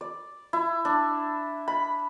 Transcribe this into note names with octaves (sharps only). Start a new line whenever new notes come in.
D5
E4
D4
B5